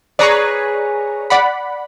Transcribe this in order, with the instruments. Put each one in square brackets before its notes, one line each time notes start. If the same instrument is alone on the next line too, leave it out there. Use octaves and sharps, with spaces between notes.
[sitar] G#4 B4 C#5 [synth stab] D5 A#5 C#6
[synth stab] D5 F#5 B5